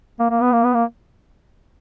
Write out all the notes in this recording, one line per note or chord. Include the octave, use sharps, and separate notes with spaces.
A#3
A#3
B3
A#3
B3
A#3